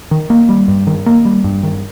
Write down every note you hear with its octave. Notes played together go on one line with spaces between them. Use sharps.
D#3
A#3
G3
G2
D#3
A#3
G3
G2
D#3